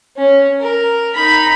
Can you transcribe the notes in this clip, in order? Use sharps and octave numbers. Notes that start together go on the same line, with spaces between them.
C#4
A#4
D#4 B5